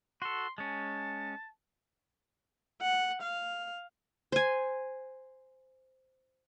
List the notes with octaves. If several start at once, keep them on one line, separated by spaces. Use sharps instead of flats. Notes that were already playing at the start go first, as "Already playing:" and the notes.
F#4 A4 C6
G#3 C#4 A5
F#5
F5
C5 G#5